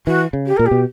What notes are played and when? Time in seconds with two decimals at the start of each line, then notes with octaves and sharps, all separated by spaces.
0.06 E3 F#4
0.33 C#3
0.46 G4
0.57 A#2 A#4
0.66 G4
0.71 B2